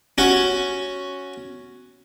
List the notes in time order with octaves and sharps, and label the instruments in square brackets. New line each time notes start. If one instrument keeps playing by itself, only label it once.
[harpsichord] C#4 F#4